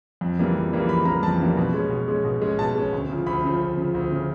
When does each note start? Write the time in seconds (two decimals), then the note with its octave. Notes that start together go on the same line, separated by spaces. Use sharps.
0.21 F2
0.39 C#3 E3 G3 A#3
0.55 F2
0.72 C#3 E3 G3 A#3
0.89 F2 B5
1.05 C#3 E3 G3 A#3 A#5
1.23 F2 A5
1.40 C#3 E3 G3 A#3
1.57 B2
1.74 G#3 C#4
1.90 B2
2.08 G#3 C#4
2.25 B2
2.42 G#3 C#4
2.58 B2 A5
2.75 G#3 C#4
2.93 D2
3.10 C#3 F3
3.26 D2 B5
3.44 C#3 F3
3.60 D2
3.77 C#3 F3
3.95 D2
4.12 C#3 F3